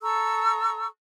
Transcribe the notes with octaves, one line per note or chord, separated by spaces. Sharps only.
A4 A#5 C#6 E6